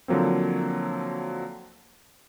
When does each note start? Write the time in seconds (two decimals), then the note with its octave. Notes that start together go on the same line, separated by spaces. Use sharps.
0.08 D3 F3 F#3 A#3 C4